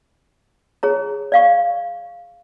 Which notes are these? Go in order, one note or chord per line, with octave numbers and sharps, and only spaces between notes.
G#4 C#5 A#5
D5 F5 C#6